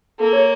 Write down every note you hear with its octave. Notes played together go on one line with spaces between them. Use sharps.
A#3 A4
C#5